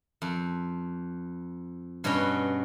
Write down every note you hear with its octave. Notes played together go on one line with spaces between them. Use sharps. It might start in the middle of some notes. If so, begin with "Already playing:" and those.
F2
G2 B2 C#4 F#4 C#5 G5